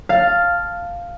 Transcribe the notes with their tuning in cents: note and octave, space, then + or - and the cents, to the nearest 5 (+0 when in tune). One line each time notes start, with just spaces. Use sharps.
F5 +0 A5 +0